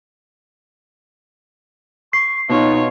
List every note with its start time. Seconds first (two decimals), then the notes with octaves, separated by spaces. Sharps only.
2.13 C#6 C7
2.49 B2 D#4 F4 C#5